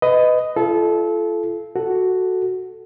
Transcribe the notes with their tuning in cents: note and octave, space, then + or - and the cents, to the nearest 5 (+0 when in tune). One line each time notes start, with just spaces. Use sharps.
B4 +25 D#5 +0
F4 -35 A4 -25
F#4 +0 A4 +0